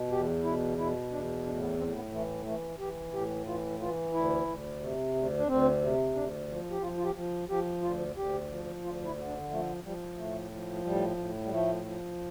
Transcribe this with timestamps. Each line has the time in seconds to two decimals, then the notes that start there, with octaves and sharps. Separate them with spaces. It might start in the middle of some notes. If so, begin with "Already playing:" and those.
Already playing: B2
0.11 E2 G4
0.44 B2 E4
0.78 B2 E4
1.11 E2 D4
1.46 A2 D4
1.61 B3
1.78 A2 C4
1.95 B3
2.12 E3 A3
2.45 E3 A3
2.79 E3 G4
3.13 A2 G4
3.46 E3 F4
3.80 E3 F4
4.13 D2 E4
4.48 D2
4.80 C3
5.15 D2
5.37 D4
5.47 D2 C4
5.81 C3
6.14 D2 D4
6.49 F3
6.71 G4
6.82 F3 F4
6.97 F4
7.05 G4
7.15 F3
7.49 F3 G4
7.82 D2 F4
8.16 D2 G4
8.50 F3
8.82 D2 F4
9.05 E4
9.17 D3
9.27 D4
9.51 F3 A3
9.83 F3 G3
10.17 A2 A3
10.51 F3
10.85 A2 G3
11.17 A2
11.44 G3
11.51 F3 A3
11.86 F3